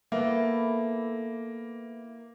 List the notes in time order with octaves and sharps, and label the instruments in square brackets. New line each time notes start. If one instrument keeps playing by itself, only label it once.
[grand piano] A#3 [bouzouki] B3 E4 A4